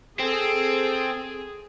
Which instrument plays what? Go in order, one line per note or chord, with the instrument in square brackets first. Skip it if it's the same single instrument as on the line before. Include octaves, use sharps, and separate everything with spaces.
[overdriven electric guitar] C4 [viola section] G#4 [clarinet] A4